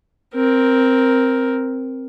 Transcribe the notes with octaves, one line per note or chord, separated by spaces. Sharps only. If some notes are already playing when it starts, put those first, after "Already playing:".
C4 A#4